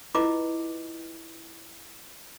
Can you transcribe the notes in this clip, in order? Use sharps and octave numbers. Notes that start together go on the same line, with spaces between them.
E4 F4 B4 D#5 D6